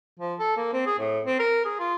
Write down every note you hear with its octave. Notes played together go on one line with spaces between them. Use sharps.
F3
A4
A#3
C4
G#4
A2
C4
A#4
G#4
F4